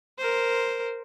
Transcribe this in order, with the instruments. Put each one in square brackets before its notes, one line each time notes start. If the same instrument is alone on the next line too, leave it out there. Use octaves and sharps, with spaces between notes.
[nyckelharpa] A#4 C5